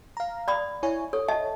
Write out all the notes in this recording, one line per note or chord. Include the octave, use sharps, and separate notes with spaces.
F5 A#5
D5 B5 D#6
E4 C#5 G#5
A4 C#5
D#5 E5 A5